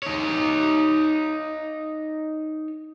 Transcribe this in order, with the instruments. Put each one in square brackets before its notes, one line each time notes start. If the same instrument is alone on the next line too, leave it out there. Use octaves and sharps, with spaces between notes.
[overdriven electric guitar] D#4 C#5